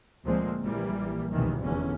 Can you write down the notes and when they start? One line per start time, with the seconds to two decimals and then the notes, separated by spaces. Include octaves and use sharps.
0.24 D2 A#2 F3 G#3 A#3 C4
0.62 A#1 E3 G3 A#3
1.32 F1 C2 B2 D#3 E3
1.61 F1 E2 D3 C#4